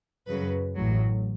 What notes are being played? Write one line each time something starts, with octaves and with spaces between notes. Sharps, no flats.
F#2 C#3 F#3 B4
A1 A2 F#3